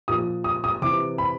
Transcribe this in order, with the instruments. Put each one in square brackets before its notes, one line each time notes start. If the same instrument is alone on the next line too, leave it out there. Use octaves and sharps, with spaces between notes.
[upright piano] A#2 F3 D#6
D#6
D#6
C3 E3 D6
B5